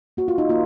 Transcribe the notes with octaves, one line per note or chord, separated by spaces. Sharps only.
A#3 F#4
F4
D#4
A#3 F4